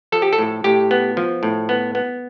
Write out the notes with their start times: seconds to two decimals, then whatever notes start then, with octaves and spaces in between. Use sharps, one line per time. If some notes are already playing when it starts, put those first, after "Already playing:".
0.12 F3 A4
0.22 G4
0.33 A4
0.38 A2
0.64 A2 G4
0.91 B3
1.17 F3
1.43 A2
1.69 B3
1.95 B3